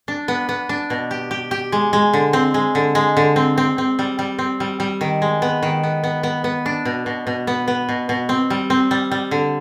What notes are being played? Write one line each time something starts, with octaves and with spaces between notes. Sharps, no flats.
D4
B3
B3
D4
B2
G4
G4
G4
G#3
G#3
D3
C4
G#3
D3
G#3
D3
C4
C4
C4
G3
G3
C4
G3
G3
D#3
G#3
B3
D#3
B3
B3
B3
B3
D4
B2
B2
B2
B3
B3
B2
B2
C4
G3
C4
G3
G3
D3